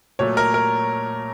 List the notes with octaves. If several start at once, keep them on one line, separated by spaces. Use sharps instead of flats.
A#2 F#3 A3 C#5
A#4
A#4